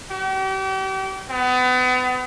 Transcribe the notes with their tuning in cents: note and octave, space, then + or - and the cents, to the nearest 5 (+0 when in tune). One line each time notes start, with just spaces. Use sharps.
G4 -40
B3 +35